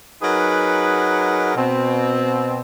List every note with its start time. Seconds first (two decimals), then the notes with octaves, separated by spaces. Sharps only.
0.22 F#3 D#4 G#4 A#4 B4 F#5
1.56 B2 C4